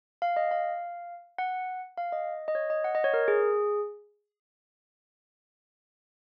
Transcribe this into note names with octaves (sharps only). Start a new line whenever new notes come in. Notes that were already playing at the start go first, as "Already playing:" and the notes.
F5
D#5
F5
F#5
F5
D#5
D#5
C#5
D#5
F#5
D#5
C#5
A#4
G#4